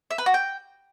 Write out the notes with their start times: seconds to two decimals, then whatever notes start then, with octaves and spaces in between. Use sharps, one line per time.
0.11 E5
0.18 B4
0.26 F#4
0.34 G5